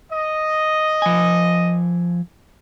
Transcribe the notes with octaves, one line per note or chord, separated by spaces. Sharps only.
D#5
F3 G#5